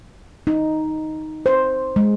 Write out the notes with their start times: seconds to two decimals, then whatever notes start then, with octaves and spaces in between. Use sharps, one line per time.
0.47 D#4
1.46 C5
1.96 G#3